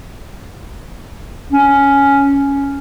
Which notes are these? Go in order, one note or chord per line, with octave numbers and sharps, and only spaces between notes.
C#4